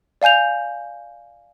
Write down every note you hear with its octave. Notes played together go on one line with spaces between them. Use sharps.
D5 F5 G#5 G6 F7